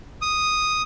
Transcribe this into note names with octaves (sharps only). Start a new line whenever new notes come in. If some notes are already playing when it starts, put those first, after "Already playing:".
D#6